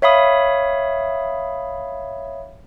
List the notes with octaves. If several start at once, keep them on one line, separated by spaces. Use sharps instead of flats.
C#5 E5 F5 B5 D#6